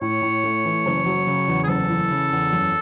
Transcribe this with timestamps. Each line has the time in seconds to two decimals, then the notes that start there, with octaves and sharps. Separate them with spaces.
0.01 A2 C#5
0.22 A2
0.44 A3
0.64 E3
0.85 F#1
1.06 F#3
1.27 C#3
1.48 E2
1.63 G#4
1.68 F#1 A4
1.89 E3
2.10 C#3
2.31 E2
2.52 F#2